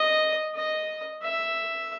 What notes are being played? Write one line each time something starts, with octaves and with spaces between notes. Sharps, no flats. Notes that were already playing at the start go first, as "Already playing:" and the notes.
Already playing: D#5
D#5
E5